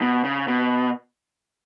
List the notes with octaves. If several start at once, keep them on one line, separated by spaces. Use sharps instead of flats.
B2
C#3
B2